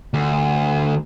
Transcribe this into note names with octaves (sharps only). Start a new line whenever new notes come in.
D2